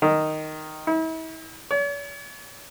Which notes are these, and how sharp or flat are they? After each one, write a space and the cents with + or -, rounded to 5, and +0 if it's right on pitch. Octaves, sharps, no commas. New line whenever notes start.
D#3 -5
E4 -40
C#5 +45